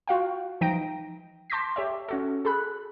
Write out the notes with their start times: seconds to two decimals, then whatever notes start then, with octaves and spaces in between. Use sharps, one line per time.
0.08 F4 F#4 F5 G5
0.61 E3 F3 D#4 G5 A#6 D7
1.50 A5 C6 D6 G6 A#6 B6
1.76 G4 C#5 E5
2.08 C#4 F#4 A4
2.45 G#4 A4 B5 F#6